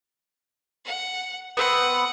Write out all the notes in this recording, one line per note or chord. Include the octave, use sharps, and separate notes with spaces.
F#5
B3 C4 B4 F#5